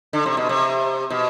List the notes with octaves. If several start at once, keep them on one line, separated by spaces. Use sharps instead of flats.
D3
C3
B2
C3
B2